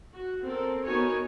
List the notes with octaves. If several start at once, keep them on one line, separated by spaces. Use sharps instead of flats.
F#4
C4 A4 A#4
B3 D#4 F#4 A#4 C#5 G#5